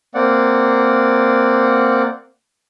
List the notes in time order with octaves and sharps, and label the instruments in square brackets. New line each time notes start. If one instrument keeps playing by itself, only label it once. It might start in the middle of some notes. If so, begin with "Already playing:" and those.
[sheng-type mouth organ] A#3 C4 D5 F#5